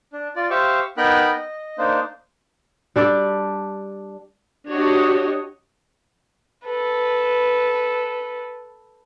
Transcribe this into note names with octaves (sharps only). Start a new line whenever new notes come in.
D4
F4 D5
G4 C5 E5 F5 C#6
B3 D#4 A#4 G5 B5 F#6
D#5
A#3 D4 D#4 C5
G3 D4 A4 D5
D4 F#4 G4 C#5 D#5
A4 B4